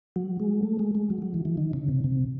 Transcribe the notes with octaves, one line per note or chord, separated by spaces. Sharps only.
F#3
G#3
A3
G#3
G#3
F#3
F#3
E3
E3
D#3
C#3
C3
C3